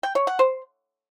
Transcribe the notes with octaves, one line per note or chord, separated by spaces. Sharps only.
G5
C#5
F#5
C5